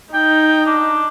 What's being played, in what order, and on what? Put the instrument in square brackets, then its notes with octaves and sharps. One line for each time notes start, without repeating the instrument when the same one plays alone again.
[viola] D#4 [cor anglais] G5
[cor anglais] D4